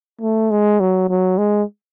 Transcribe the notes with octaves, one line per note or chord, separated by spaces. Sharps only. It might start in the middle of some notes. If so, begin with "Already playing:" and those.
A3
G#3
F#3
F#3
G#3